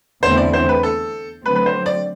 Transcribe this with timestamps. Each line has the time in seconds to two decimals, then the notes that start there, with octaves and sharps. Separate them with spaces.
0.23 E2 D3 A3 C4 E4 C5
0.37 D5
0.53 C5
0.69 B4
0.83 A4
1.45 D3 F#3 A3 C4 B4
1.56 B4
1.66 C5
1.86 D5